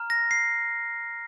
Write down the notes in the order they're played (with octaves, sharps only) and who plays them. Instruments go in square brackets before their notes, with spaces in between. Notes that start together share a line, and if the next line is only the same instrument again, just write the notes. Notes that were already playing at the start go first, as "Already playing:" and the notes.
Already playing: [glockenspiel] A#5 F6
A#6
C7